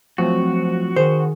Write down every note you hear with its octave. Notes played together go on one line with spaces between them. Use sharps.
F3 F#3 A3 C4 F#4
D#3 G#4 C5